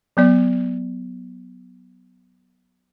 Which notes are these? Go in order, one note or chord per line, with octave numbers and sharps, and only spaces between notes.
F#3 B3 D5